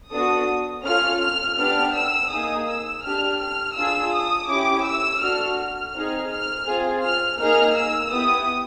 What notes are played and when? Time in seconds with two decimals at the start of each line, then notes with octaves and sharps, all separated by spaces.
0.12 B3 D4 F#4 A4 D#6
0.85 C#4 F4 A4 F6
1.21 F6
1.58 B3 D4 G4 F6
1.95 E6
2.31 A#3 D#4 G#4 D#6
2.68 E6
3.04 D4 G4 F6
3.40 F6
3.76 D4 F4 G#4 E6
4.13 D#6
4.50 C#4 E4 G4 D6
4.85 E6
5.22 D4 F#4 A4 F6
5.59 F6
5.95 C4 D#4 G#4
6.30 F6
6.67 C4 F4 G#4
7.04 F6
7.40 A#3 D#4 G#4 F6
7.76 E6
8.12 B3 E4 G4 D#6